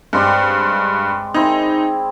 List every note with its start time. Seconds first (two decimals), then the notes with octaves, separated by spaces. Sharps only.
0.13 G2 G#3 C4 D5
1.34 C4 D#4 E4 G#4